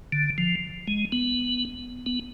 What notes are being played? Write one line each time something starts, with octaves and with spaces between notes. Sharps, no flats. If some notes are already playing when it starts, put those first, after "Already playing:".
D3
F3
G#3
B3
B3